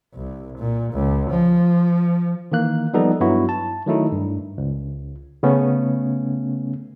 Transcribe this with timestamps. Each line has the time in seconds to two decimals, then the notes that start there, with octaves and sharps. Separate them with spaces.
0.14 C2
0.58 A#2
0.93 C#2
1.30 F3
2.52 D#3 E3 A#3 F#6
2.93 F3 G3 B3 D#4 A4
3.20 G2 F#3 B3 E4 F#4
3.49 A5
3.86 D#3 F#3 A3 D#4 E4
4.12 G2
4.58 C#2
5.43 C#3 A3 B3 C#4